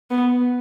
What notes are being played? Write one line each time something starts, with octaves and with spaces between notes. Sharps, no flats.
B3